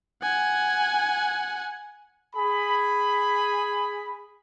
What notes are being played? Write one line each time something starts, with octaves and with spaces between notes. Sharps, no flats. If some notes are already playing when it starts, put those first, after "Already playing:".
F#5 G#5
G#4 B5